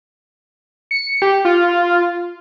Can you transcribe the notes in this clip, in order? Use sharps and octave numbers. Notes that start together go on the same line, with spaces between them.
C#7
G4
F4